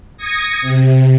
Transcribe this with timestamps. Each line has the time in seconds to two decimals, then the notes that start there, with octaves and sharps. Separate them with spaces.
0.17 D#6 G#6 A#6 C#7
0.61 C3